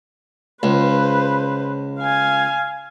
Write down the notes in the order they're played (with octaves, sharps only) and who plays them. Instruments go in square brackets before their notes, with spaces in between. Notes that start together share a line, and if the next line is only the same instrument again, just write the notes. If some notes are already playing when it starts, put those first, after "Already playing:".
[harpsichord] C#2 [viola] B4 C5
[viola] F5 G#5